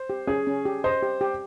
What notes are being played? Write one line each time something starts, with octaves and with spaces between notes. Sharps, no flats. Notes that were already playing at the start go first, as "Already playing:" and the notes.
Already playing: C5
G4
C#4 G#4
C#4
G4
C5 D#5
G4
G4